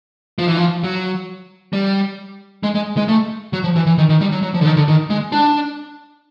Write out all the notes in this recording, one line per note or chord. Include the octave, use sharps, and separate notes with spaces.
F3
E3
F3
F#3
G3
G#3
G#3
G#3
A3
F#3
F3
E3
E3
D#3
D#3
G3
F#3
F#3
F3
D3
D#3
D3
D#3
G#3
D4